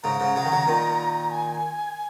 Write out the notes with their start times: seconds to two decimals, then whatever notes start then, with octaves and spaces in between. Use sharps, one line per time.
0.03 G#2 C#3 A#5
0.20 G#2 C#3
0.36 C#3 F#3
0.45 D#3
0.52 C#3 F#3
0.67 A#2 D#3
1.31 G#5